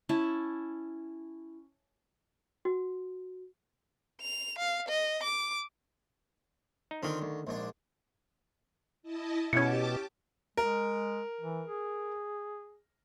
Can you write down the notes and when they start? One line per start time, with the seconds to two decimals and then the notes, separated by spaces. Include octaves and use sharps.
0.09 C#4 E4 A5
2.65 F#4
4.22 F7
4.59 F5
4.89 D#5
5.24 D6
6.91 D#4
7.03 D3 D#3 C4 F4 G#5
7.22 D2
7.47 A#1 G#2 D4
9.03 E4 D#5 A5
9.53 B2 C#4 E4 G4 A5 D6 G#6 C#7
10.57 G#3 A#4
11.41 E3
11.68 G#4